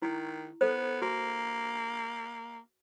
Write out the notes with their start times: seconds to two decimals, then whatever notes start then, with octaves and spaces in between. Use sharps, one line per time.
0.02 D#3 E4
0.61 B3 A4 C5
1.02 A#3 F#4